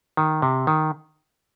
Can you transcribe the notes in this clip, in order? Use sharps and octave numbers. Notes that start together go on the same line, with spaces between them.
D#3
C3
D#3